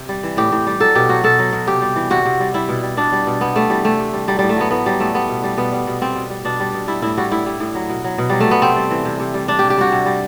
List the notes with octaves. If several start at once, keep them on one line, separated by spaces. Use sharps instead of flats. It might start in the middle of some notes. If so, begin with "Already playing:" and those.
Already playing: C3
G3
E3
A2 G4
A2
G3
F#3 A4
B2 G4
F#3 F#4
B2 A4
F#3
B2
C3 G4
G3
E3
C3 F#4
C3
G3
G3 E4
B2
G3
B2 D4
G3
B2
C3 B3
G3 A3
E3 G3
C3 A3
C3
G3
F#3 G3
A2 G3
A3
F#3 B3
A2 B3
F#3 G3
A2 A3
G3 B3
B2
G3
B2 B3
G3
B2
G3 C4
B2
G3
B2 D4
G3
B2
G3 E4
A2 E4
G3 F#4
A2 E4
G3
A2
F#3
B2
F#3
B2
F#3 G3
A3
B2 B3
C3 C4
G3
E3
C3
C3
G3
G3 D4
C3 G4
G4
G3 F#4
C3
G3